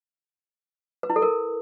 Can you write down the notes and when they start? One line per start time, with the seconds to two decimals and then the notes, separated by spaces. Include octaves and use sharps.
1.03 B4
1.10 E4
1.16 A4
1.22 A#4